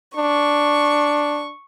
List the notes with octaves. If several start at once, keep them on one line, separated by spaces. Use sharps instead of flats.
D4 C#6